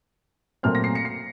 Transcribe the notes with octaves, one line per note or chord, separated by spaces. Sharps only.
A#2 F#3 A3 C4 F6
A#6
C7
C#7
C7